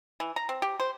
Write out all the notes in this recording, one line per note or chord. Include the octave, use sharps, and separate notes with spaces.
E3
A#5
C4
G4
C5